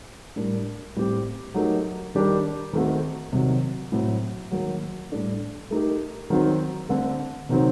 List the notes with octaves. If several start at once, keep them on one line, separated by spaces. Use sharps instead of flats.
A2 G3 D4 G4 A#4
A2 G3 C4 G4
F#3 A3 D#4 G4 A#4
D#3 G3 D4 G4 A#4
D#3 A3 C4 F#4
C3 D#3 F#3
A2 F#3 C4
D#3 F#3 A#3
A2 G3 D4 A4
A3 D#4 G4 A#4
D#3 F#3 C4 D#4 F#4
D3 A3 C4
C3 D#3 F#3 C4 D#4